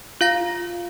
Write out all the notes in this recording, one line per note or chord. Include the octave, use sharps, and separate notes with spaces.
F4 F5 A#6